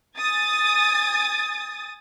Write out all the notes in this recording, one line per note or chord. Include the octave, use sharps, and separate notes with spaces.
G#5 D#6 A6